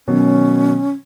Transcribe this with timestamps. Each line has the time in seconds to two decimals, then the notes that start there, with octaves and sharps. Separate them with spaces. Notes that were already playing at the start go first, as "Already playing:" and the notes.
0.08 B2 D#3 F#3 C#4